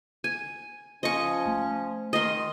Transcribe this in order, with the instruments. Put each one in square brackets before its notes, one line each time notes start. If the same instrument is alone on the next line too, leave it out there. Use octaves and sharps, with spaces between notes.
[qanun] G#5
[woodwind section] F3 C#4 [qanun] D#5 C#6
[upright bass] A3
[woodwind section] D#3 [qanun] D#5 C6